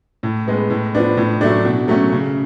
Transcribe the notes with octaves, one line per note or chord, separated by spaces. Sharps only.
A2
G#3 B3
A2
F3 B3 D4
A2
F#3 A3 D4
B2
F#3 A3 C#4
C#3